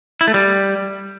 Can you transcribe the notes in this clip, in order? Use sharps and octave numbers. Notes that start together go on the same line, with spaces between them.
E4
A3
G3